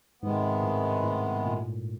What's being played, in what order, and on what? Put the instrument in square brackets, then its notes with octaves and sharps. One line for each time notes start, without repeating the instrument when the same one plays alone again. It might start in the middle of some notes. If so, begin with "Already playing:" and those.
[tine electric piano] G#2 [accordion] C3 D#3 G#3 B3
[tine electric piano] A2
A2
A#2